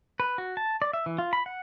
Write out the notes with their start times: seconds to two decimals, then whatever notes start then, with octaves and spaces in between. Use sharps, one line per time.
0.20 B4
0.38 F#4
0.57 A5
0.82 D5
0.93 E5
1.06 E3
1.18 F4
1.33 B5
1.46 F#5